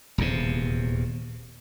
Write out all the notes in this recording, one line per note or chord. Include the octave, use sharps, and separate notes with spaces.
D#1 E2 C3